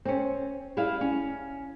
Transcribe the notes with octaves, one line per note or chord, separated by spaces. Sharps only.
C4 C#4
G3 E4 G#4 E5 F5
C#4